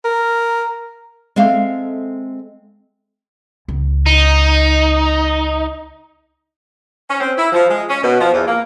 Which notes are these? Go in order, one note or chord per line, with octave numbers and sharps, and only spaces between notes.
A#4
G#3 C4 A4 E5 F5
C#2
D#4
C#4
C4
E4
F3
G#3
C#4
B2
F3
E2
A#3